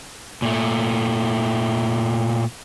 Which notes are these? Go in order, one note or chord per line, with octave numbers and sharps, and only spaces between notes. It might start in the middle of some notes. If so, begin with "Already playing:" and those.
A#2 A3